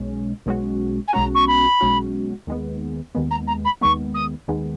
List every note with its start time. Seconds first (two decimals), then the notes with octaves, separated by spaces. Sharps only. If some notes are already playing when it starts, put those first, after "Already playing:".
Already playing: B1 B2 G#3 C#4
0.46 B1 B2 G#3 C#4 F#4
1.07 G#5
1.13 B1 B2 G#3 C#4 F#4 A#5
1.34 C#6
1.47 B5
1.81 B1 B2 G#3 C#4 F#4
2.47 D#2 D#3 G#3 B3
3.15 D#2 D#3 G#3 B3
3.30 A#5
3.47 A#5
3.64 B5
3.81 D#2 D#3 G#3 B3 C#6
4.14 D#6
4.48 D#2 D#3 G#3 B3